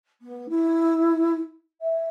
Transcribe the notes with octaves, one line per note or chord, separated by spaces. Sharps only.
B3
E4
E5